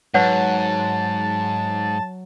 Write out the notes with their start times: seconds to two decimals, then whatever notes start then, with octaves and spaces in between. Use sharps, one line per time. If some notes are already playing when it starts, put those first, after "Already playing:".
0.14 G#2 F#3 B4 C#5 F#5 A5